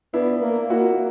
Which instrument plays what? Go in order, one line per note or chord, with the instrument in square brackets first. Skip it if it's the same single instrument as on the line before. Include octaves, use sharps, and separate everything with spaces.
[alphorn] B3 [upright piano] D4 E4
[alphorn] A#3
[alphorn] A#3 [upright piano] E4 F#4